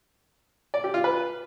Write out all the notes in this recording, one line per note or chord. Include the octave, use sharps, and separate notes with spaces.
D5
G4
F4
B4